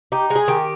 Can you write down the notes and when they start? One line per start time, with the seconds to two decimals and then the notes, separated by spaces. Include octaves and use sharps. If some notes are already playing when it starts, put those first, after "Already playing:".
0.12 D#4 G4
0.30 G#3
0.36 G#4
0.48 D#3 G4